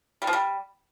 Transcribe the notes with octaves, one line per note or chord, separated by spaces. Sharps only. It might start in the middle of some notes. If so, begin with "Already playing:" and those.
G3
F3
G3